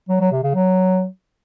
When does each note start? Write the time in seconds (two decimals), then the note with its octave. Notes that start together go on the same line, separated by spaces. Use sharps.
0.09 F#3
0.20 F#3
0.32 C3
0.43 C#3
0.54 F#3